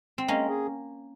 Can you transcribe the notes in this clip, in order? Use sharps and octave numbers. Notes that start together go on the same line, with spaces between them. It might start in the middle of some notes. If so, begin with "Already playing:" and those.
C4
G#3 A#3 C#4
G#4